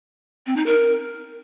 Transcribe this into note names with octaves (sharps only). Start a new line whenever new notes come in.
C4
D#4
A#4